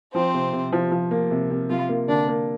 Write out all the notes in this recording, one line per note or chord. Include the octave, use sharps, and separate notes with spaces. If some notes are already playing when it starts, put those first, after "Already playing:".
F3 C4 C5
C3
C3
F3
F3
A#3
C3
C3
C3 F3 F4
A#3
D3 A#3 D4
A#3